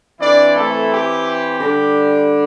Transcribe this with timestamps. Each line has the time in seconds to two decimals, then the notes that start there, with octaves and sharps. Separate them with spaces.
0.20 E3 C4 D4 E4 D5
0.55 A3 A4
0.91 G4
1.60 D3 G3 D4